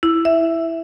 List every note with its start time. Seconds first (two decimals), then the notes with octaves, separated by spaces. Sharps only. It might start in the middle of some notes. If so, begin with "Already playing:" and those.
0.03 E4
0.25 E5